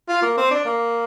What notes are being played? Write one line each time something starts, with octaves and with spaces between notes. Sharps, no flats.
F4
A#3
C4
D4
A#3